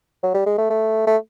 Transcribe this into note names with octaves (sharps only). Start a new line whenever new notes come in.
F#3
G3
G#3
A3
A3
A3